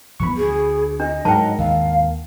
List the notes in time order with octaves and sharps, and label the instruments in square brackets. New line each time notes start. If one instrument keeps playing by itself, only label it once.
[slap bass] F2 E3 B3 [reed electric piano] B5 C#6
[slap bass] D2 [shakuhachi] G#4
[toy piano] D4 [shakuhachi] D#5
[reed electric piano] G#2 A#4 F#5 [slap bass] F#3 [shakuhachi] D#5 [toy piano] G5 A5
[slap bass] D#2 [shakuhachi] F5